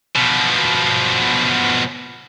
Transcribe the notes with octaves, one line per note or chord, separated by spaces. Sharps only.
B2 F3